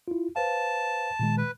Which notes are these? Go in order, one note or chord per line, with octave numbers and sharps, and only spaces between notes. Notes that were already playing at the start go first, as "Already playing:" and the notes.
E4 F4
B4 C5 F5 A5
A#2 D#3 G#3
B4